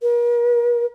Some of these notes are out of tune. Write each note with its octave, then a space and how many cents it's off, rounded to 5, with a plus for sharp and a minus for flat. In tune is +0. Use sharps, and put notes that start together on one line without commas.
A#4 +40